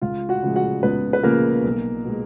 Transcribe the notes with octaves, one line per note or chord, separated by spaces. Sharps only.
C#2 F4 F5
F#4 F#5
C#3 F3 G#3
F#4 F#5
C#2 B3 B4
B4
C#3 F3 G#3 A#3 A#4
B1
B2 G#3